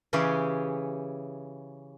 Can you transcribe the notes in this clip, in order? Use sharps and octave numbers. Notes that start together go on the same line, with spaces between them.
C#3 E3 C#4 G4 G#4